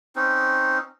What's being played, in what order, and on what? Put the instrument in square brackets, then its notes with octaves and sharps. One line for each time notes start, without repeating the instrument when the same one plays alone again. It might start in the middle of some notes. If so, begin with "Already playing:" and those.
[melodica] C4 C#4 D#4